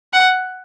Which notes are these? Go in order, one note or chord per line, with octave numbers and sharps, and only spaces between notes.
F#5